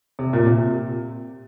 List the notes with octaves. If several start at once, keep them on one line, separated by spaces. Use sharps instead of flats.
C3
A#2
C3